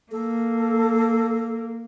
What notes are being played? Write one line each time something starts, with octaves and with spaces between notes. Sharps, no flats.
A#3 A4